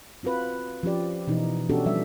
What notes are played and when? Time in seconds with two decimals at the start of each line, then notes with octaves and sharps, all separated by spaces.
0.23 C4 F4 F#4 B4
0.83 F3 C#4 G4 D5
1.27 B2 E3 D#4
1.69 B3 C#4 D4 F#4 G4 A4
1.86 F3 G3 E5